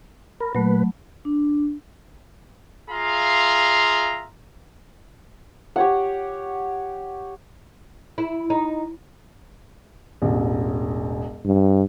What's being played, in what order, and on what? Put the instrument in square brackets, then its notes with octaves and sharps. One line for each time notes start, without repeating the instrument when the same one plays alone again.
[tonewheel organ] A#4 [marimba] B5
[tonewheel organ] A#2 B4 [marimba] F#3 A3
[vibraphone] D4
[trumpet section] F4 G#4 E5 F5 A#5 C6
[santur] G4 C#5 F#5
[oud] E4
D#4
[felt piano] E1 A1
[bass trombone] G2